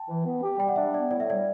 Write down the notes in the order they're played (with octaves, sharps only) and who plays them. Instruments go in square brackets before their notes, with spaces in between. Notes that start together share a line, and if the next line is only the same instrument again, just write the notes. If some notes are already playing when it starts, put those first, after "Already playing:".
Already playing: [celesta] G5 A5
[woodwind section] E3
B3
G4
[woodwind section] G3 [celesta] G5
[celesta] F#5
[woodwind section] D4 [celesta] E5
[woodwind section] B3 [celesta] D5
[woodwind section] A2 [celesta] D5
[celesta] E5
[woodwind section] G3 [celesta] D5